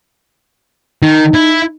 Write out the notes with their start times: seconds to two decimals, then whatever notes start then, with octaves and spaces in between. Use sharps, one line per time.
1.02 D#3 D#4
1.34 E4